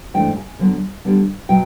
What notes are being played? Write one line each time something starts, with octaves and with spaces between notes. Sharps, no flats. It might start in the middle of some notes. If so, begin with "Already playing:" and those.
G#2 E3 A3 D4 G5
G#5
D3 F#3 B3 D4
D3 G3 B3 D4
B2 F#3 G5